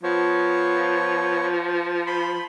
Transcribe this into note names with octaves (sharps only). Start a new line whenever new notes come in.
F3 B3 C#5
B5 C6